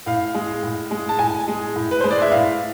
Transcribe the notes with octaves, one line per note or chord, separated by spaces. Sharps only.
A2 F5
G#3
A2
G#3
A5
A2 G#5
G#3
A2
B4
G#3 C5
D5
E5
A2 F5